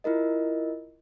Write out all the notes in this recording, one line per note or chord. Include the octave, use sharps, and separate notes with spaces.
E4 F4 A#4 D#5